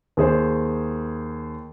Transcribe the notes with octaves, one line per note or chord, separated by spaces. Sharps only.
D#2 G#4 C5